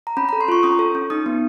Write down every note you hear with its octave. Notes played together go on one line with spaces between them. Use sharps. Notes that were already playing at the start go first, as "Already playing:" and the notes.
A#5
C#4 B5
A#5
A4
C6
F4 C#6
C#4 D#6
A4
C#4
D#4 D#6
B3